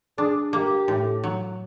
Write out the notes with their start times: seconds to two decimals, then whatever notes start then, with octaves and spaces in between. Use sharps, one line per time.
0.18 D4 G#4
0.53 A#3 G4
0.88 A2
1.24 F#3